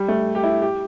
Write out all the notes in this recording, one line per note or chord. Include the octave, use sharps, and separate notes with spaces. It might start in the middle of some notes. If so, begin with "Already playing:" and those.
Already playing: G3
A3
G4
E4
G4